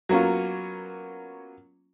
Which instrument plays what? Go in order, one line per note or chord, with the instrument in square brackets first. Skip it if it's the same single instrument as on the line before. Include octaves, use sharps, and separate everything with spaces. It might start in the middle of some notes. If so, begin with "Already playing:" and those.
[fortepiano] F#3 A#3 B3 C#4 F4